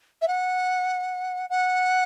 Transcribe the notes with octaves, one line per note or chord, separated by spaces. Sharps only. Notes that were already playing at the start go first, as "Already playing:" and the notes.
E5
F#5
F#5